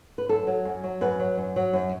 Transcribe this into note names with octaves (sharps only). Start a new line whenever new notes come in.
B4
F#2 A4
F#3
F#2
F#3
F#2 B4
F#3
F#2
F#3
F#2